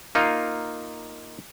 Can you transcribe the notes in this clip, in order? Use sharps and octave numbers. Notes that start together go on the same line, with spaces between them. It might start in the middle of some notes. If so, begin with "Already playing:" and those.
A#3 D#4 F4